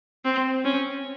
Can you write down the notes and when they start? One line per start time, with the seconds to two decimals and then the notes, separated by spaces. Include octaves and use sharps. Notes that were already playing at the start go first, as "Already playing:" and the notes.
0.25 C4
0.64 C#4